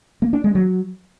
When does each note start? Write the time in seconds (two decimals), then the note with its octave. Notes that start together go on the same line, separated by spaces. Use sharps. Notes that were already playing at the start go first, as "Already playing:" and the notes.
0.22 A#3
0.33 D4
0.44 G#3
0.55 F#3